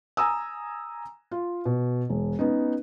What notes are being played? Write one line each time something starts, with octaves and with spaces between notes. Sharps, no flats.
G#5 A#5 D#6 E6
F4
B2
E1
B3 C#4 D#4